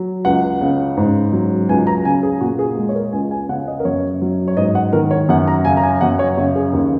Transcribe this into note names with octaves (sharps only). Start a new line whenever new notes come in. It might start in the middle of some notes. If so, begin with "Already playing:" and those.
Already playing: F#3
C#2 F#5
C#3
G#2
F#3
C#2 G#5
A#5
C#3 G#5
G#4
A#2 F#4
G#4
G#3
C#5
A#4
C#2 G#5
G#5
C#3 F#5
D#5
A#4
F#2 C#5
F#3
C#5
G#2 D#5
F#5
D#3 A#4
C#5
F#2 F#5
A#5
C#3 G#5
A#5
G#5
F#2 F#5
C#5
C#3 C#5
G#4
D#2